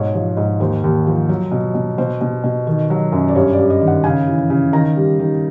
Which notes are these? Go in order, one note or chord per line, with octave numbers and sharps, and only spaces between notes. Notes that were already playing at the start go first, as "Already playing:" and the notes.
Already playing: G#2 B2 C#5
F3
G#2
D#2 C5
D#2
F3
F#3
B2
B2
B2 C5
B2
B2
D#3
F#3
F#2
D5
G2 C#5
D5
G2
D#5
D#3
F#5
C#3 G#5
E3
C#3
D#3 A#5
G3
D#3